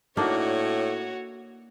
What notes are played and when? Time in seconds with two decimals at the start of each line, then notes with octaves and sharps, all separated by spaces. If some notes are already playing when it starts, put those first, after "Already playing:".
0.17 A2 A#3 D4 D#4 F#4 C#5